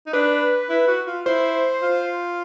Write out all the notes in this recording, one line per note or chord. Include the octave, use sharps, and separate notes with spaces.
D#4
D4 B4
E4
F#4
F4
E4 C5
F4